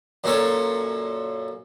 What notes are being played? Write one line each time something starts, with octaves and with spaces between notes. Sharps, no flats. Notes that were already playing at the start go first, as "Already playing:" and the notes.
F#2 A#2 C#4 A4 C#5